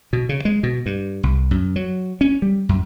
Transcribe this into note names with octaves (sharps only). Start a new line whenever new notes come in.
B2
C#3
G#3
B2
G2
C2
F#2
F#3
C#4
G3
F#2